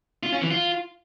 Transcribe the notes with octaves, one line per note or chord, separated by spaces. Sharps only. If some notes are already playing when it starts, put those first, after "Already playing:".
F4
C#4
E3
F4